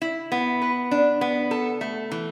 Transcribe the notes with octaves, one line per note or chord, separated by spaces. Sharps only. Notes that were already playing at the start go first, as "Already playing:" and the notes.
E4
B3
B4
D4
B3
A4
A3
E3